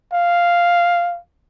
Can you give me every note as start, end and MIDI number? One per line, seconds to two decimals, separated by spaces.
0.13 1.19 77